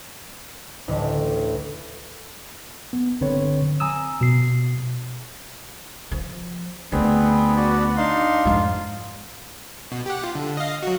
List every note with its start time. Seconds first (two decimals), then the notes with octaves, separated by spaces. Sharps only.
0.88 A1 D2
2.93 B3
3.21 G1 D3 C4 B4 C#5
3.80 G#5 A#5 D#6 E6
4.21 B2 C7
6.11 F3
6.92 D2 B3 C4 D4 G#4
7.56 F#4 D5
7.97 D4 D#4 F5 C6
8.45 F2 G#2 F4
9.92 B2
10.06 G4 F#5
10.24 F4
10.35 D3
10.57 D#5 F5
10.83 F#3 F#4